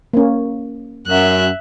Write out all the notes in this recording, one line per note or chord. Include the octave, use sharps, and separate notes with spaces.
A#3 C#4
F#2 E5 F#6